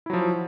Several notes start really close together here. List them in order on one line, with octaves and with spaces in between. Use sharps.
E4 F#3 F3